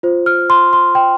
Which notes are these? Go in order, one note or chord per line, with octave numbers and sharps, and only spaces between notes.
F4 C5
F6
C6
C6
G5